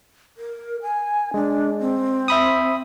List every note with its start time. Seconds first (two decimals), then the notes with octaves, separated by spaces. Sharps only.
0.37 A#4
0.83 G#5
1.34 G#3 D4
1.80 C4
2.28 E5 B5 D#6